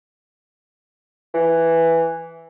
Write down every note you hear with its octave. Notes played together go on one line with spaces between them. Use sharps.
E3